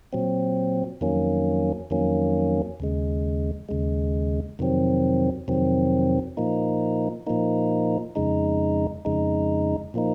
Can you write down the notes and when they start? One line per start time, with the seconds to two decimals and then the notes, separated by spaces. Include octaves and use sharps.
0.13 A#2 F#3 C4
1.01 F2 D#3 F#3 A#3 C#4
1.90 F2 D#3 F#3 A#3 C#4
2.80 D#2 C#3 G#3
3.69 D#2 C#3 G#3
4.59 F2 C3 D#3 F#3 C4
5.48 F2 C3 D#3 F#3 C4
6.37 A#2 F3 A#3 D#4
7.27 A#2 F3 A#3 D#4
8.15 F2 C#3 G#3 D#4
9.05 F2 C#3 G#3 D#4
9.94 A#2 F3 A#3 D#4